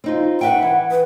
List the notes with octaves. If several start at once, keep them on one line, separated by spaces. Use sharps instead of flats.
C4 D#4 F4
B4 E5 F#5 G5
E3
B4